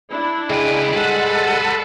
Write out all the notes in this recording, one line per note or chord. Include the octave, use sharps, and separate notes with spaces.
D4 E4
C#3 G#3 B4 G5
G3 A4 B4 C5 F#5